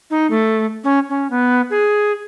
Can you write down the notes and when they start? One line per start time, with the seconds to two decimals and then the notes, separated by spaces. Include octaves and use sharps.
0.10 D#4
0.31 A3
0.84 C#4
1.10 C#4
1.31 B3
1.70 G#4